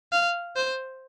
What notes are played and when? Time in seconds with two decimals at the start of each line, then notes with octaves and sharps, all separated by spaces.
0.12 F5
0.56 C5